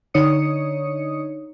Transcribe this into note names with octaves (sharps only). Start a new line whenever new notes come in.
D3 D#4 C#5 D#6 C#7